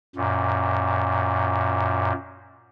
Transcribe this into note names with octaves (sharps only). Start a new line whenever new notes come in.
F#2 A#2